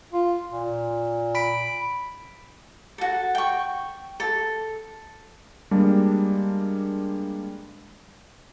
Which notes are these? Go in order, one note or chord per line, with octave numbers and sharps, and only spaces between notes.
F4
A#2
B5 B6 D7
F#4 A4
G5 C#6
A4
G3 G#3 A#3 D4